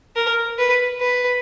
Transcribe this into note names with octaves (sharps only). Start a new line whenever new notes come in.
A#4
B4
B4